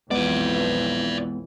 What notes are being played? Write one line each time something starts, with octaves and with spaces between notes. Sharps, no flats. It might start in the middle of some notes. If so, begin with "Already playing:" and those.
B1 F2 E3 G#3 B3 B4 D5